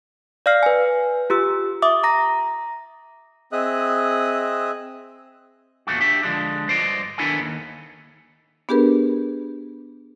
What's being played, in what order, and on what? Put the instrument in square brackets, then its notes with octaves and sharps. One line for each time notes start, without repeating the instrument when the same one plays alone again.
[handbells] D5 F5 F6 C7
B4 G#5
F4 G4 E6
E5 D6 D#6
A#5 A#6
[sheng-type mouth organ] C4 G#4 D#5 E5 D#6 F#6
[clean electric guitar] E2 G2 A#2 A3 F#4
D4 G4 E5
D3 F3 G#3 D4
G2 C5 D5 D#5
D#3 B3 D4 E4 A4 G#5
D#2
[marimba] B3 D4 G4 G#4 A#4 B4